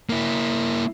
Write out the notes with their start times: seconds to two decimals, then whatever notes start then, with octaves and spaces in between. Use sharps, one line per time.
0.09 A#3 E4